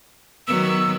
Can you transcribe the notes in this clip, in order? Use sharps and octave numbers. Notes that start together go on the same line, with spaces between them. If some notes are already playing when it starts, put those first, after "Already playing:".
D#3 F#3 B3 E6